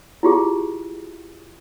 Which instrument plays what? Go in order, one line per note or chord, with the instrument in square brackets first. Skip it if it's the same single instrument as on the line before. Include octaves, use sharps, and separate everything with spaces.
[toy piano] E4 F4 G4 G#4